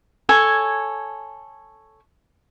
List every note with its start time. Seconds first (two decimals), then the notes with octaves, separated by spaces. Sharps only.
0.29 A4 C#5 G#5